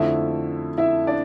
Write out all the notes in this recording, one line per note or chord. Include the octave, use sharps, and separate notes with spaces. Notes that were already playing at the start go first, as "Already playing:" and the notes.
Already playing: F2 D3 A3 E4 E5
E4 E5
D4 D5